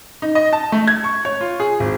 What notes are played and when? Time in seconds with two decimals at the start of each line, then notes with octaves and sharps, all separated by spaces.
0.22 D#4
0.35 D#5
0.53 A5
0.72 A3
0.87 G#6
1.04 C#6
1.25 C#5
1.41 F4
1.60 G#4
1.80 G#1